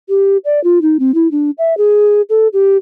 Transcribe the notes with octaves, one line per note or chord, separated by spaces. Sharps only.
G4
D5
F4
D#4
C4
E4
D4
E5
G#4
A4
G4